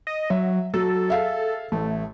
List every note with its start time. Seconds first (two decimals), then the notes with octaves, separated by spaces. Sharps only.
0.07 D#5
0.30 F#3 E5
0.74 F#3 A4
1.08 G#4 E5 F5
1.72 A1 A3